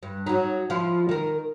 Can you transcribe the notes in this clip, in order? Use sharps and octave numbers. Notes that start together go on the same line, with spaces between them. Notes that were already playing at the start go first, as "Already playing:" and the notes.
G2
F#3 D#4
F3 E4 F4
D#3 A#4